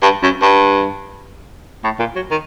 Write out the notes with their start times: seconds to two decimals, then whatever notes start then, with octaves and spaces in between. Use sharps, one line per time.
0.02 G2
0.23 F#2
0.42 G2
1.84 A2
1.99 A#2
2.16 F#3
2.31 D#3